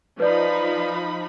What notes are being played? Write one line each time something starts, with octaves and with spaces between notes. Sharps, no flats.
F3 D#4 B4 D5 B5